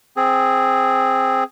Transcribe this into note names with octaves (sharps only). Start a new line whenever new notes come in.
C4 G#4